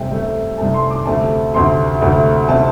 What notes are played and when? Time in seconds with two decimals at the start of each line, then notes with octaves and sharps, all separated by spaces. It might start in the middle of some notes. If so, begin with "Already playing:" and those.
Already playing: C2 C3 A3 G5
0.11 C2 C3 A3
0.58 C2 C3 A3 A5
0.74 C6
0.91 D6
1.06 D2 C3 A3 A5
1.54 D2 C3 A3 C6
2.02 D2 C3 A3
2.49 C3 A3 A5